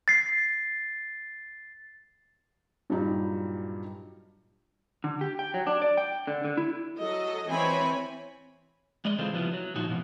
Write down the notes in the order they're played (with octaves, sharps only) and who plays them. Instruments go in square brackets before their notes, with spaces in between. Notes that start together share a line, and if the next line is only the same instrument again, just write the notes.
[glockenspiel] A6 C7
[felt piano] G2 A#2 F#3 G3 D#4
[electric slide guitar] D3
G4
G5
F#3
D4
D5
G5
D3
D3
E4
[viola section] F#3 A4 D#5
E3 C4 C#5 G#5 B5
[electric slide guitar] G#3 D5 D#5
C#3 E3 G#3 C4 F4 A4
F3 G3 B3 E4 F4
F#3
A#2 F3 D#4 F#4
F2 B2 E3